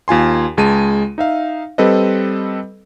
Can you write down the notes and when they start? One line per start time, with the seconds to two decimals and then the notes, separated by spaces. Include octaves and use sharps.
0.08 D#2 F4 G#5 C6
0.57 C#2 G#3 A5 D#7
1.18 D#4 E5 F5
1.78 G3 C4 A4 B4 D#5